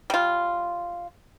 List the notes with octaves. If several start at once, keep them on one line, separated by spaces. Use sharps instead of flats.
G3 F4